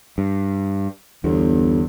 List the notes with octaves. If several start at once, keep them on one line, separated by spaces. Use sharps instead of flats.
G2
G1 E2